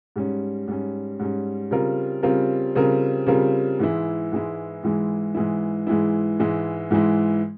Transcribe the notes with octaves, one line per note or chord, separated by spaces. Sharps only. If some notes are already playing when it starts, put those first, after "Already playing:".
G#2 G3 C#4
G#2 G3 C#4
G#2 G3 C#4
C#3 G3 C4 F4 A#4
C#3 G3 C4 F4 A#4
C#3 G3 C4 F4 A#4
C#3 G3 C4 F4 A#4
G#2 E3 G#3 E4
G#2 E3 G#3 E4
G#2 E3 G#3 E4
G#2 E3 G#3 E4
G#2 E3 G#3 E4
G#2 E3 G#3 E4
G#2 E3 G#3 E4